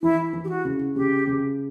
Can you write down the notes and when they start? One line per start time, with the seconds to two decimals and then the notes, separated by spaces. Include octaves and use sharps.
0.02 E3 E4
0.33 E3
0.44 G4
0.49 F#4
0.65 C#3
0.96 C#3 G4
1.27 C#3